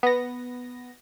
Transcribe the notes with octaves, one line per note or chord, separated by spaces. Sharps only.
B3 A#6